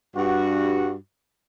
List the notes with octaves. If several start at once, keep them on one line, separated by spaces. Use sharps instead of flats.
G2 F#4